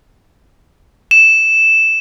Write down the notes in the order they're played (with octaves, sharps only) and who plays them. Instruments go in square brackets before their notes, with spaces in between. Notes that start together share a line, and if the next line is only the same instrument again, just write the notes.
[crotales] E7